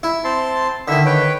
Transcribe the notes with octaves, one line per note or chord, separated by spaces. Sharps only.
E4
C4 A5 C6
D3 D#3 E4 E5
B4 C#5 G5